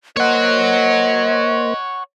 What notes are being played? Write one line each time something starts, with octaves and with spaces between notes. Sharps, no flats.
A#3 C5 C#5 D#5 F#5